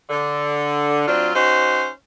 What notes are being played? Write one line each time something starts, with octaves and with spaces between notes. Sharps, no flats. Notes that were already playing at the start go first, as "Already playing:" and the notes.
D3
F#3 C4 D4 F4
C#4 D#4 F#4 C5